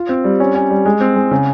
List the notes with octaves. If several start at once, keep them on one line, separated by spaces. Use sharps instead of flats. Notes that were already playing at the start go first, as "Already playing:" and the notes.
Already playing: F4
C4
G3
C#4
C#4
G3
G#3
C4
G#3
C#3